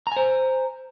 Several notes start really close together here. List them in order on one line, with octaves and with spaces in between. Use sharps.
A#5 G#5 C5